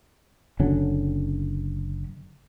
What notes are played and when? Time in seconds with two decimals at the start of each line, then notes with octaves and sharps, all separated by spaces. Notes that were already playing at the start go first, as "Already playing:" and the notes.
0.60 F#1 D3 F#3 C#4